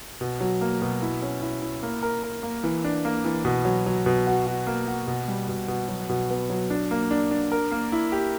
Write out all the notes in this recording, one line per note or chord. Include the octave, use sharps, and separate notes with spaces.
B2
F#3
A#3
B2
E4
C#4
E4
E4
A#3
A#4
A#4
A#3
E3
D4
A#3
E3
B2
F#3
F#3
B2
F#4
F#4
A#3
F#4
B2
G3
B2
B2
F#3
B2
B3
F#3
D4
A#3
D4
D4
A#4
A#3
E4
G4